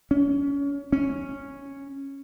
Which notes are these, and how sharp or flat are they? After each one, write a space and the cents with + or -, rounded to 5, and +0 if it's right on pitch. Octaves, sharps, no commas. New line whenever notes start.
C#4 +30
C#4 -5